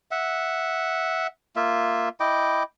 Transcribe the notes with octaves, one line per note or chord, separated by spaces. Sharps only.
E5 F#5
A#3 F4 E5
E4 D#5 G5 D6